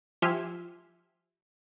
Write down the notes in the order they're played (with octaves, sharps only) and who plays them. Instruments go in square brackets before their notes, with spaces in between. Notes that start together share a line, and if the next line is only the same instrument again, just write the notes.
[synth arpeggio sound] F3 G4 E5 G#5 C6 F6